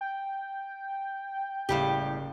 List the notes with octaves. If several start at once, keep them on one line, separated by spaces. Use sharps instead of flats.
G5
F#1 A2 G3 G4 F5